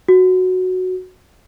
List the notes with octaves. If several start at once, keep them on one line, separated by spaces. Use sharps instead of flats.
F#4